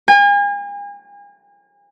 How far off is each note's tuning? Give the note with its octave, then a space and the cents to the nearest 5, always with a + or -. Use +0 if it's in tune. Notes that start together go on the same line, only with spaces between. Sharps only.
G#5 -40